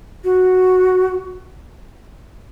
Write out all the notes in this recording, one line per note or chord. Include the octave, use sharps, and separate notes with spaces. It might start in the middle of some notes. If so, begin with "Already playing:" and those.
F#4